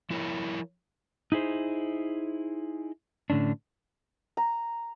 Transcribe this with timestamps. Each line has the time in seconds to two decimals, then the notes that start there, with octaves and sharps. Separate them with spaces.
0.10 F3 E4 A#4 C#5
1.32 D#4 E4 G#4 C5
3.30 A2 D3 C#4 D4
4.37 A#5